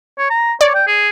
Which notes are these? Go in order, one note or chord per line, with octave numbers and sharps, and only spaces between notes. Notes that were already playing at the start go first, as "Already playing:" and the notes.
C#5
A#5
C#5 D5
G5
G#4